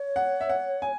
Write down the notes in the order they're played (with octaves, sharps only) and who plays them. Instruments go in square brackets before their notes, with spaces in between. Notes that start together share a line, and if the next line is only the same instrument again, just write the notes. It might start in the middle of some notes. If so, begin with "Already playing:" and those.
Already playing: [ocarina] C#5
[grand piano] F#5
E5
F#5
G#5